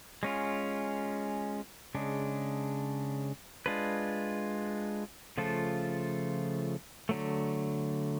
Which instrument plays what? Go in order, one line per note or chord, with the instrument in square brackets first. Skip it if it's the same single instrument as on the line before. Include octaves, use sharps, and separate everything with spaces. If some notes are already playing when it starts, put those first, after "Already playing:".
[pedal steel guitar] G#3 C#4 F4
C#3 G#3 D4
G#3 D4 F4 B4
C#3 F3 A3 F4 A4
D3 F#3 A3